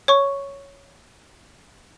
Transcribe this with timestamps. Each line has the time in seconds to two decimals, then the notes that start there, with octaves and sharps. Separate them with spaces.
0.08 C#5 C#6